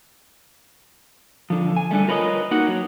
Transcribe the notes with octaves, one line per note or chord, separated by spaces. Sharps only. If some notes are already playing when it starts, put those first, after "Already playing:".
D3 F3
G#5
D3 G3 A3
F4 A#4 B4 C#5 D#5
A#3 D#4 F#4 F#5
F#3